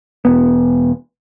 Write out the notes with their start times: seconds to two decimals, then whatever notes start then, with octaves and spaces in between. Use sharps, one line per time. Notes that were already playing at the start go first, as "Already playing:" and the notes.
0.25 E1 B3